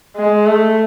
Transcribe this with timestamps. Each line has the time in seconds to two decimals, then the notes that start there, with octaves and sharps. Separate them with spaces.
0.16 G#3
0.46 A3